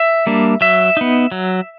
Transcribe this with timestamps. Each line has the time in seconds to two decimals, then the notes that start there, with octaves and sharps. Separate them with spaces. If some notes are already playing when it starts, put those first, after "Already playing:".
Already playing: E5
0.27 G3 A#3 D4
0.61 F#3 E5
0.97 B3 D#4
1.32 F#3